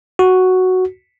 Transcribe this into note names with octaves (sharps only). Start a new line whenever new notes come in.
F#4